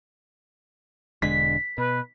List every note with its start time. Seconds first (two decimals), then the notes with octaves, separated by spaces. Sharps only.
1.22 E1 D3 G#3 B6
1.78 B2 B4